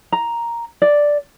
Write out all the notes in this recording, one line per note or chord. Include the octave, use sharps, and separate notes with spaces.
A#5
D5